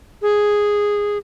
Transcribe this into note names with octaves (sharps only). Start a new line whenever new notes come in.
G#4